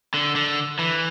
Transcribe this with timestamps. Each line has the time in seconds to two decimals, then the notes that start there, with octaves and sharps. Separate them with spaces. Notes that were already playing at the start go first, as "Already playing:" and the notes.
0.14 D3
0.36 D3
0.79 E3